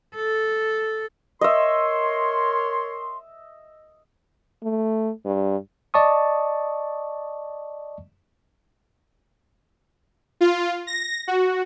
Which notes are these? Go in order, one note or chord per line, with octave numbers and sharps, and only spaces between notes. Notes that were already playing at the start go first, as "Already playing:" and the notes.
A4
A#4 C#5 D#5 E5 C6
A3
G2
D5 D#5 A5 C#6 D#6
F4
A#6
F#4